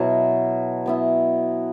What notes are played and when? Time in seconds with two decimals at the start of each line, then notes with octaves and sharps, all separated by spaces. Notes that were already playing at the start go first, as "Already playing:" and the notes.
Already playing: B2 F#3 E4
0.86 F#3 B3 E4